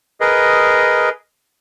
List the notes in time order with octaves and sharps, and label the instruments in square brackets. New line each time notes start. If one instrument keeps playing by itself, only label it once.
[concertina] G#4 A#4 B4 D#5